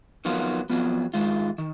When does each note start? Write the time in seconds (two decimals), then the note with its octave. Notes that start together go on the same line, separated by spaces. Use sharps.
0.25 F2 D#3 F#3 B3 F4
0.70 F2 D#3 F#3 B3 F4
1.14 G#2 D#3 G#3 F4
1.58 D#3